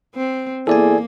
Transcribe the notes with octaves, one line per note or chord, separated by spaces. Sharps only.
C4
E2 A#3 G#4 A4 D5 G#5